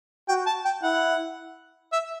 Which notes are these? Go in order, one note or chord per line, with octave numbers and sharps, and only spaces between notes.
F#4 G5
A5
G5
E4 F#5
E5